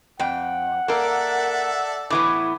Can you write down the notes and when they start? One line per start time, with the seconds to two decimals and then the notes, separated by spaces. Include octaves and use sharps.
0.20 F2 F#5 G5
0.88 A#3 A4 A#4 D5 E5
2.10 A2 E3 B3 D6